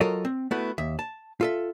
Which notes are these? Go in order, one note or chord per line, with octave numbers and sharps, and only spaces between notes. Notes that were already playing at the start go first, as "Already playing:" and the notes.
F#3 F4 A4 A#4 C#5 D#5
C4
A3 B3 E4 F#4 B4
D#2 E5
A5
F4 A4 E5